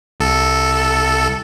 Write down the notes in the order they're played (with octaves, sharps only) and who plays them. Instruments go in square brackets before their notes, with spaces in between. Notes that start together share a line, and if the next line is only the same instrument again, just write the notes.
[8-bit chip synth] C2 A4